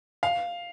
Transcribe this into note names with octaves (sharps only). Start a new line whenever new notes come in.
F5